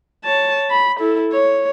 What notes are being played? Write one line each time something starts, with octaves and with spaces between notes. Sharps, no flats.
C#5 A5
B5
E4 A4
C#5